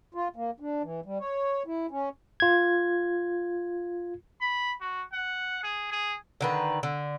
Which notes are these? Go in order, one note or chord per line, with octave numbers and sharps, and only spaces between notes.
F4
A#3
D4
E3
G3
C#5
E4
C#4
F4 G#6
B5
F#4
F#5
G#4
G#4
D3 D#3 B4
D3